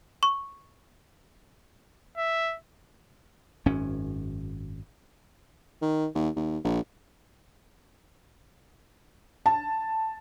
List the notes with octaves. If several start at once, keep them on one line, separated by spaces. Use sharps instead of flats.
C#6
E5
G#1 F#2 C#4
D#3
D#2
D#2
A#1
A5